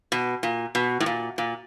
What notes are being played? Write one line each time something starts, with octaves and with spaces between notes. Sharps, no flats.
B2
A#2
B2
A2
A#2
A#2